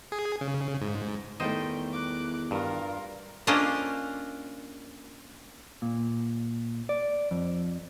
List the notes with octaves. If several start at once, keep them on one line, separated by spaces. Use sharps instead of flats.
G#4
C#3
G#2
E2 D#3 G3 A3 C5 D#5 G5
D6 F#6
G2 F4 A#4
A#3 C#4 D4 F4 C5 D#5
A#2
D5
F2